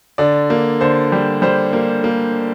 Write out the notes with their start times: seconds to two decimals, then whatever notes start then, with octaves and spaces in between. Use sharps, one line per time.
0.18 D3 D5
0.50 A#3
0.81 D3 C5
1.12 G3
1.42 G3 C5
1.73 A#3
2.04 A#3